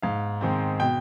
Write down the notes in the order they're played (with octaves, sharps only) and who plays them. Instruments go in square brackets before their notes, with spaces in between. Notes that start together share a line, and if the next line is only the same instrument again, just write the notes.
[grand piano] G#2 F5
D#3 G#3 C4
B2 G5